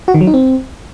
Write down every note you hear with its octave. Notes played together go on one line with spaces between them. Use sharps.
F#4
D#3
F#3
D#4
C4